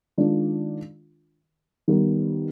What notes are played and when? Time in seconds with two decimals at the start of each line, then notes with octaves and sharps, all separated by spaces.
0.18 D#3 G#3 D4 F4
1.88 D#3 G3 B3